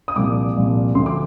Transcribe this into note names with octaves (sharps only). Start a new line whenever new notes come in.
D#6
C2 A#2 F3 D6
C2 A#2 F3
D2 D3 F3 C6
D6